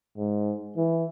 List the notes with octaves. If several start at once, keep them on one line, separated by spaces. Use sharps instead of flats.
G#2
E3